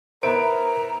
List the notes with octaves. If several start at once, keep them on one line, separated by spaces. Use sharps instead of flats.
B3 E4 A#4 C5 A#5 D7